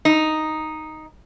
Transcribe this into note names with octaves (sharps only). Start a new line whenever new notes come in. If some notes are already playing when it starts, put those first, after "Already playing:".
D#4